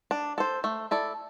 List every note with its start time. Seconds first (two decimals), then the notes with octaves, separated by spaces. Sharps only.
0.11 D4
0.38 A4 C5
0.64 A3
0.91 E4 A4 D5